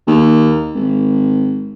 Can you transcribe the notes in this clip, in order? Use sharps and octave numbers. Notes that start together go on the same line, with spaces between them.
D#2
G#1